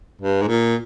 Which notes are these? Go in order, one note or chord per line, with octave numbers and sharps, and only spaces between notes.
G2
G#2
A#2